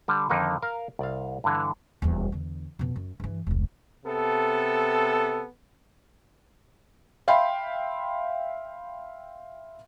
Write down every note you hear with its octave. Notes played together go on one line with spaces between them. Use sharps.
D3 G3
F2 D3 D#3 A#3 D#4
A#4 F5
C2 D5 F5
G2 D3 E3
D#1 E2
E2 D3
F2 B2
F#2
G2 E3
E1 C2
C3 B3 A4
E5 F5 G5 B5 C6